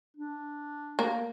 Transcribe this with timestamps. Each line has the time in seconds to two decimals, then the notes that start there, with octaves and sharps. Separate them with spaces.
0.17 D4
0.99 A#3